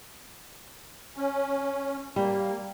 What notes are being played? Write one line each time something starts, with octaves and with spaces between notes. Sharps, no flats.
C#4
G3 A#3